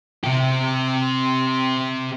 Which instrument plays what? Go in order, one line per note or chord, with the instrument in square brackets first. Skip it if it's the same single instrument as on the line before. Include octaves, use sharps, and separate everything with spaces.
[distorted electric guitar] C3 G4